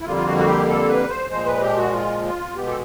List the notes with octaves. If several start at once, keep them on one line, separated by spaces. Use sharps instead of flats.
E4
F2 D3 G3 A#3 F4
F4
F#4
F#4
G4
A4
B4
C5
A#2 F3 G#3 C5
B4
G4
F#4
F4
F4
B2 G#3 B3 G4
A4